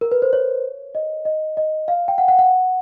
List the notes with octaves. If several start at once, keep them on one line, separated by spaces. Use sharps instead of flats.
A#4
B4
C5
C#5
D#5
D#5
D#5
F5
G5
F#5
F#5
F#5